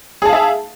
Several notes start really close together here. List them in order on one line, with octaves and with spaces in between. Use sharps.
G#4 A5 F5 E5